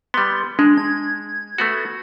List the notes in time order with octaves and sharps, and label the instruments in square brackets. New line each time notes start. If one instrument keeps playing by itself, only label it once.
[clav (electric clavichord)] G3 B3 [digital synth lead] C6
[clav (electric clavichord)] G#3 [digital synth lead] D4
[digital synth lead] G#6
[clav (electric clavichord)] A3 B3 F#4